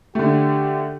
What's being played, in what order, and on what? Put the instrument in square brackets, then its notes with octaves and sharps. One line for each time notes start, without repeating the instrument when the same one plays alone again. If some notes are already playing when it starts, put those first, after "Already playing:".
[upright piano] D3 A3 [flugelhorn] G4